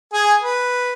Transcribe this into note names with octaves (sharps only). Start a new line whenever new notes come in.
G#4 G#5
B4